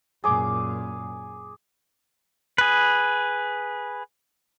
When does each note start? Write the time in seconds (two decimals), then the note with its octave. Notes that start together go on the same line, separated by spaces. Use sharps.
0.24 F#2 A#2 G#4 D6
2.58 G#4 B4